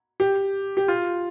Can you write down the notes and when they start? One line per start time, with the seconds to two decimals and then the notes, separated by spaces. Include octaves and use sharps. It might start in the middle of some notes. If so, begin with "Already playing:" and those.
0.20 G4
0.77 G4
0.88 F4